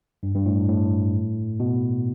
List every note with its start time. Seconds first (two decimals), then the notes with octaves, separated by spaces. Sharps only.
0.23 G2
0.35 G2
0.46 A2
0.68 A2
1.60 B2